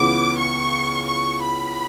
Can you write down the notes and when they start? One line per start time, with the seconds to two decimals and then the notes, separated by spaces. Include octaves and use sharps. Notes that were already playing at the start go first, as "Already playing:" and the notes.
Already playing: C#2 C#3 E3 B3 D6
0.38 C#6
1.07 C#6
1.42 B5